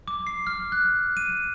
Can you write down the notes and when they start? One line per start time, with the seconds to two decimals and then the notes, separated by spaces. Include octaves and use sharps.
0.08 D6
0.27 C7
0.47 F6
0.72 F#6
1.17 D#7